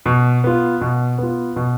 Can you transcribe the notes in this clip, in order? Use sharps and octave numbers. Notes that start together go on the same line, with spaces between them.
B2
B3 F4
B2
B3 F4
B2